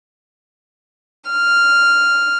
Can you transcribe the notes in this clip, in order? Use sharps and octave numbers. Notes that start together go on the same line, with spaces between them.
F6